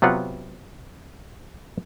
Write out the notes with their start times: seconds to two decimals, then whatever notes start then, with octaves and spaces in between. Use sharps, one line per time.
0.02 C3 F#3 B3 F4 F#5